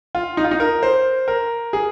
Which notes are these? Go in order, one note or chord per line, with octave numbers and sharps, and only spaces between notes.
F4
D#4
F4
D#4
A#4
C5
A#4
G#4